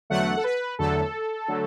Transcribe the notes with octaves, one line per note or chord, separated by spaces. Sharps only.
E2 D3 F#3 A3 F#5
A4
B4
E2 D3 F#3 A3 A4
D3 F#3 A3